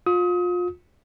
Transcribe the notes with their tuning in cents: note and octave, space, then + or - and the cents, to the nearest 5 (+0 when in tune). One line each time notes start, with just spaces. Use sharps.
F4 +30 D#6 +35